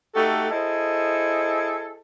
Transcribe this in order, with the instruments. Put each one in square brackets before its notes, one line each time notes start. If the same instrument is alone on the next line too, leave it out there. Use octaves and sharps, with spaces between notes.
[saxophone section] A3 D#4 F#4 G4 A4
E4 G#4 A4 C5 D#5